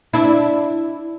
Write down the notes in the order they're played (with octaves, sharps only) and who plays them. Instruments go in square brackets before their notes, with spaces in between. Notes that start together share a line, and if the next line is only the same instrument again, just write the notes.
[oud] D4 E4